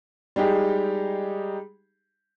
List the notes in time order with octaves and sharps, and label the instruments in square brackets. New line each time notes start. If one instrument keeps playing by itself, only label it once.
[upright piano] G3 G#3 D#4 G4 G#4